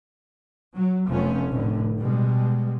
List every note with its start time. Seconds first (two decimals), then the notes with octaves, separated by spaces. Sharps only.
0.77 F#3
1.08 F1 F2 F3 A3 B3 C#4
1.51 F1 A2 D3
1.99 B2 G3 G#3